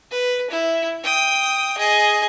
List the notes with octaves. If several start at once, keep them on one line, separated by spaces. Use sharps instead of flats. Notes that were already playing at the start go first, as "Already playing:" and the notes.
B4
E4
G5 D#6
G#4 D#5